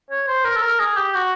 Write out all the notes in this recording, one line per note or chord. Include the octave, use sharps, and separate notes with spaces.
C#5
C5
A#4
A4
A#4
G#4
G4
F#4